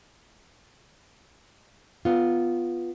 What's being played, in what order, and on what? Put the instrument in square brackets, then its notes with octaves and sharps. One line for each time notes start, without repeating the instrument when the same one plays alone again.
[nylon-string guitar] B3 F4